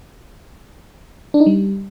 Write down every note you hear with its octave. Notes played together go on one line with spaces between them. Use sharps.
D4
D#4
G3